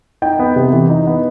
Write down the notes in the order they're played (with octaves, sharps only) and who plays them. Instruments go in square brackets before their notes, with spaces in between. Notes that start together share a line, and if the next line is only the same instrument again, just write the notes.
[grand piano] D#4 G5
B3
C3
E3
D#4
B3